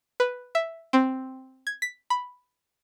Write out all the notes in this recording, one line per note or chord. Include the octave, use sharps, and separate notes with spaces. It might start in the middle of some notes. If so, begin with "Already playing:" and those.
B4
E5
C4
G#6
B6
B5